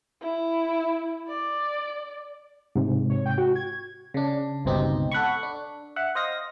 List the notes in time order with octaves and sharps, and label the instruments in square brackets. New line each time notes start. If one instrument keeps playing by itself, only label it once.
[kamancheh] E4
D5
[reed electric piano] G#2 C3
[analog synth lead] C#5
G5
F#4
G#6
[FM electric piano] C#3 D4
G1 C#2 B2 C4 D#4 G4
A4 F#5 B5 C#6
D4
E5 F#5
C5 D#5 F5 A#6